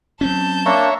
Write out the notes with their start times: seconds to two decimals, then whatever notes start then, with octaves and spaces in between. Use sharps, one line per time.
0.21 F#3 C4 C#4 A5 G6
0.66 A#3 D4 C#5 E5 A#5 C#6